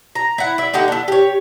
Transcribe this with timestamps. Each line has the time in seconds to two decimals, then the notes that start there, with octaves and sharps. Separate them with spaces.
0.15 A#5
0.38 E4 F#5
0.58 D5 E5
0.74 D3 D#4 G4 F#5
0.88 D4 E4
1.08 G4 C#5